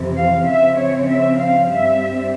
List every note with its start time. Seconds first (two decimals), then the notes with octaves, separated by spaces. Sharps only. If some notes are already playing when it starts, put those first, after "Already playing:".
Already playing: F2 C3 E3
0.16 F5
0.46 C#3 F3 C4 E5
0.78 C#5
1.08 E5
1.38 F5
1.69 G2 G3 C4 E5